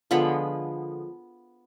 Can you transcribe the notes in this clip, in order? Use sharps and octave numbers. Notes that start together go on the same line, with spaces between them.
D3 F3 G#3 B3 B5